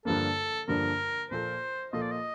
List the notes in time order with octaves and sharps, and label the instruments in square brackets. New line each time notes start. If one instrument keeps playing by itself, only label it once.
[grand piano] G2 D3 F3 A#3 [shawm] A4
[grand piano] G2 D3 F3 A#3 [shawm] A#4
[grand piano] A#2 F3 A#3 F4 A4 [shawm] C5
[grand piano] A#2 F3 A#3 F4 A4 [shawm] D#5
[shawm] D5
D#5